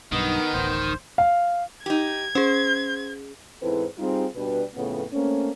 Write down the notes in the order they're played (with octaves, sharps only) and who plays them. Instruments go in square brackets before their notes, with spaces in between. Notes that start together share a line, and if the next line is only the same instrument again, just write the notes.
[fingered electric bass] B1 G2 [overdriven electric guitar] D#3 [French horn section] B3 D#4 [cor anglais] D#5
[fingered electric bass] D1 A1 [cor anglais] C5
[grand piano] F5
[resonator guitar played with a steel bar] D#4 G4 [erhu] G#6
[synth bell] C#4 G#4 [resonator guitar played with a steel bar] C5
[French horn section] E2 G#2 C4 E4 A4 B4
G3 C4 D#4 F4 G4 G#4
B2 G3 D4 B4
F2 A2 C#3 B3
A3 A#3 C4 C#4